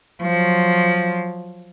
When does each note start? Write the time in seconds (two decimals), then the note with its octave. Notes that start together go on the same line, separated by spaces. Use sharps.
0.21 F3 F#3